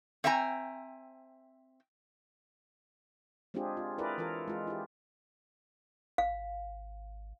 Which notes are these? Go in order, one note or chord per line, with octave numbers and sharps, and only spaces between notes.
C4 E5 G5 G#5 A#5
G#3 C4 D4 F4 G4 G#4
F4
E4 G#4 A#4 B4 D5
E3 F4 A4 A#4
G#3 F4
E4 G4
G#1 F5